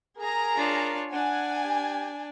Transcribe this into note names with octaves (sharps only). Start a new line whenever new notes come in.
G#4 A#4 A#5
D4 F4 C#5
D4 F#5 G#5
G4